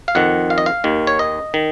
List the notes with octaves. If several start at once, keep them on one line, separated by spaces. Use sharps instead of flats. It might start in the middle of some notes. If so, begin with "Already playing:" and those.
F5
F2 D#3 F#5
F5
D#5
F5
D#2 D#3
C#5
D#5
D#3